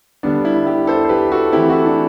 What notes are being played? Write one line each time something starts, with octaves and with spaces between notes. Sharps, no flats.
D3 G3 B3 D4
E4
E4 G4
A4 C5
C5
G4 B4
F#4 A4
E3 A3 C4 E4 G4
F#4 A4
D4